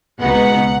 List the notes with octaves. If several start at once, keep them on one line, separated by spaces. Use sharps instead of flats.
C#2 B2 G#3 B3 D#4 F#5